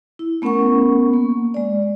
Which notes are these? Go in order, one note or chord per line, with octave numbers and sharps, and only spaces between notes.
E4
A3 B3 C#4 A#4 F#5 C#6
A#3
G#3 D5